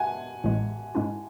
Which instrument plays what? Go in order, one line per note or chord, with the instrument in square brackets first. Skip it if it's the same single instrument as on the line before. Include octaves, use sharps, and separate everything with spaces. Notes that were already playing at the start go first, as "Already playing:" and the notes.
Already playing: [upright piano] F#5 G#5
[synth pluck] A1 A2 G#3
G#2 G#3 C#4 E4